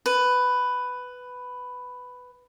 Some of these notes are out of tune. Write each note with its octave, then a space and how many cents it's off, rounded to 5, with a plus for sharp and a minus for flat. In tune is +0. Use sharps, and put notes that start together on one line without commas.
B4 +10